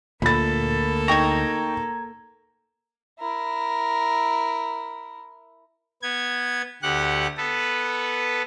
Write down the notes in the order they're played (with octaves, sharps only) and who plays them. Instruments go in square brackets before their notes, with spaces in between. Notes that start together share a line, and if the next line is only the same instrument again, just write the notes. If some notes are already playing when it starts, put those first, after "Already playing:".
[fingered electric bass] D2 [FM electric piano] A#2 [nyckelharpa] A#3 A4 [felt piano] B5 A6
[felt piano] D#4 G5 C#6 [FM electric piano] A#5 G#6
[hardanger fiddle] E4 A#4
[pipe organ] B3 G#6
D2 G4 F#5 F#6
B3 A4 B4